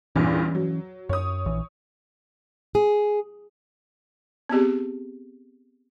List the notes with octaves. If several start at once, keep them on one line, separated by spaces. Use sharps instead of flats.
E2 G2 A#2 E3 C#4
F#3
F#2 C#5 D#6
A#1 E3
G#4
B3 C4 G4 G#4